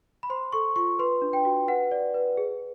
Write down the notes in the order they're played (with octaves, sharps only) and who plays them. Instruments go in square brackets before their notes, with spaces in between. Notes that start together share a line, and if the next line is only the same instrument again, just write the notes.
[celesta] B5
C5 C6
A4 C#6
F4 C#6
B4 C6
D4
G5
F#4
B4 F#5
D5
B4
G#4